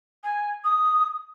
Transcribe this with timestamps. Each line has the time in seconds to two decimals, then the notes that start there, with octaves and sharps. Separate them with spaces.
0.24 G#5
0.64 D#6